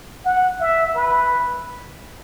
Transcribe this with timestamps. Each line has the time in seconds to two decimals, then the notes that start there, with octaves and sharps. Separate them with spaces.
0.25 F#5
0.60 E5
0.95 B4